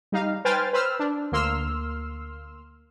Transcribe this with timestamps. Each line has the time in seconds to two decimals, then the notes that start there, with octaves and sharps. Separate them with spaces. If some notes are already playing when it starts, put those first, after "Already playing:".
0.12 G3 D#4 F5
0.45 B4 C5 G5 G#5 F6 A6
0.73 B4 C5 E6 F6
0.99 D4
1.32 D2 A#3 C6 E6 F6